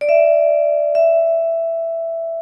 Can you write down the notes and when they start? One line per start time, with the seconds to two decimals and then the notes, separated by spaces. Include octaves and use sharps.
0.01 D5
0.09 E5
0.95 E5